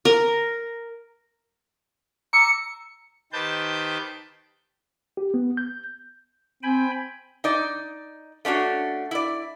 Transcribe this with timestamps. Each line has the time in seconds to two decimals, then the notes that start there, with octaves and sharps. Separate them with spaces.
0.05 A#4
2.33 A#5 D6 E6 C#7
3.33 D#3 G4 B4 C5 A5 G6
5.17 G4
5.34 B3
5.57 G6
6.63 C4 G5 G#5 B5
7.44 D#4 D5
8.45 A3 C#4 D4 F#4
9.11 E4 D5